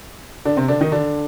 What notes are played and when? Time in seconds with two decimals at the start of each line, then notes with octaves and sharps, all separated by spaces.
0.45 D3 D4
0.57 C3 C4
0.68 D3 D4
0.81 D#3 D#4
0.92 D3 D4